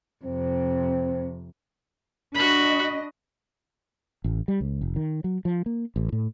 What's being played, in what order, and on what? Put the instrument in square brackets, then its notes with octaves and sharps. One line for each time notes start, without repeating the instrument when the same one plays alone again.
[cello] F2 C3 [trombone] C4
[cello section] D4 D#5 [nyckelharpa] F#4 B5
[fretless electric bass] A1
G3
C#2
F1
D#3
F#3
F3
A#3
A1
A2